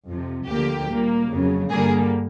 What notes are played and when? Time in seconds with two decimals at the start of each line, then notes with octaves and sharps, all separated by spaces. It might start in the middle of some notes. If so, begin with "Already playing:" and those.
0.08 F2 C3 F3
0.48 D2 D3 F3 A#3 G4
0.89 A#2 G3 A#3
1.30 F2 C#3 F#3
1.70 G2 D3 G3 A#3 G#4